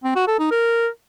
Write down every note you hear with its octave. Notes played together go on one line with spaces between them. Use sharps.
C4
F#4
A4
D#4
A#4